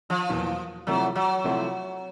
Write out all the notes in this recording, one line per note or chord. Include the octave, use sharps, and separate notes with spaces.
F3
E2 B2 F#3 A#3
C3 F3 F#3 A3 C4 E4
F#3
C3 F3 A3 C4 E4